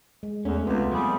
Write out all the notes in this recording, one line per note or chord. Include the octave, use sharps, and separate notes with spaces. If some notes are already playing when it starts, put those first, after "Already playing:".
G#3
E2 A3 C#4
C#2 C3 B3 F4
F3 G3 G#4